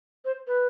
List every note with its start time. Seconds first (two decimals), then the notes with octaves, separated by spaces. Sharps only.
0.25 C5
0.48 B4